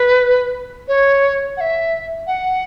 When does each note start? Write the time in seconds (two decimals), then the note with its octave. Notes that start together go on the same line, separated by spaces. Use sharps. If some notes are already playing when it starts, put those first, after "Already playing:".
Already playing: B4
0.88 C#5
1.57 F#5
1.61 E5
2.27 F#5